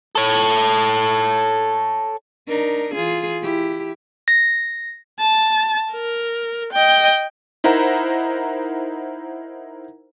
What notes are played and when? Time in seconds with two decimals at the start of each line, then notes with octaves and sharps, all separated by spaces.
0.15 A4 C#5
2.47 D4 D#4 A#4
2.94 E3 F4 G#4
3.42 E4 G4
4.28 A#6
5.19 A5
5.93 A#4
6.73 D#5 G5
7.64 D#4 E4 A#4 C5 F#5 A#5